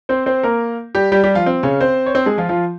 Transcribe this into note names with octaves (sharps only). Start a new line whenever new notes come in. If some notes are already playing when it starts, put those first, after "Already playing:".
C4 C5
C4 C5
A#3 A#4
G3 G4
G3 G4
G3 G4
F3 F4
C4
C#3 C#4
C4 C5
C#5
C4 C5
G#3 G#4
F3 F4
F3 F4